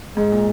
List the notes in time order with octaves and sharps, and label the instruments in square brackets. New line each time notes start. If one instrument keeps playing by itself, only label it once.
[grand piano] G#2 [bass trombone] G#3
[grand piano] A#2